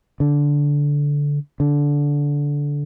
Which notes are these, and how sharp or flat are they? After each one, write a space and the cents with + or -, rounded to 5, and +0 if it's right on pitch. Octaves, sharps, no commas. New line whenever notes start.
D3 -15
D3 -15